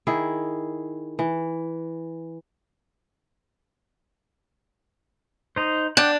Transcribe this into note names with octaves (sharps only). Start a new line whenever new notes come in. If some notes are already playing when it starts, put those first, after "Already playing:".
D#3 E4 G#4
E3
D#4 C5
D4 F#5 G5 D6